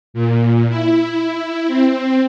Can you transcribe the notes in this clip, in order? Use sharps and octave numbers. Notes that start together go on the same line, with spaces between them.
A#2
E4
C4